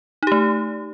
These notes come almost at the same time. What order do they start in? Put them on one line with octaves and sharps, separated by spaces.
D#4 G4 A3